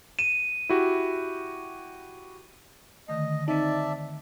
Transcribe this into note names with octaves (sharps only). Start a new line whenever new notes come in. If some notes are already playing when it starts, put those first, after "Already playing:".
D#7 E7
E4 F#4 G4
D3 D#3 A3 D#5
C4 D#4 D5 E5 A5